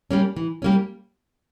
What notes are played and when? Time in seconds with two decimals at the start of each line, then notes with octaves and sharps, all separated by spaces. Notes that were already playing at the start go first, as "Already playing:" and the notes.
0.11 G3 A#3 C#4
0.36 E3
0.62 G3 A#3 C#4